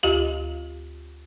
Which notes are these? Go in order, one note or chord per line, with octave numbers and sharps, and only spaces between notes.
D2 F4 G4 F5